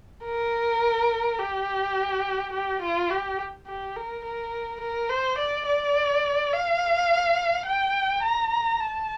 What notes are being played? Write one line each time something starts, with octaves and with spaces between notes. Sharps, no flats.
A#4
G4
G4
F4
G4
G4
A#4
A#4
A#4
C5
D5
D5
F5
G5
A#5
A5